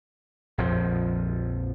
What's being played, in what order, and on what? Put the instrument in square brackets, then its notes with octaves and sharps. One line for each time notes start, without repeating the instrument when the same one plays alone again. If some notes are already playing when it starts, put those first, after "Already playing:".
[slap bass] A#1 F2 F3